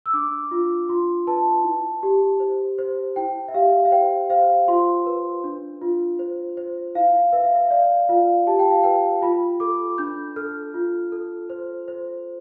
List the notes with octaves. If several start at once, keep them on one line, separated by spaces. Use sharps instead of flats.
E6
D4 D6
F4
F4 C6
B4 A5
E4
G4
C5
C5
E4 G5
E5
G4 F5
F5
C5 G5
C5 F5
F4 C6
B4
D4
F4
C5
C5
E4 F5
B4 E5
F5
E5
D5 F5
F4 F5
G4 A5
G5
F5
B4 G5
F4 B5
A4 D6
D4 G6
A4 F6
F4
A4
C5
C5